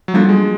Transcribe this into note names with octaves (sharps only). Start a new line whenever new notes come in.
F#3
F3 G3 A#3 D4 F#4 A4
G#3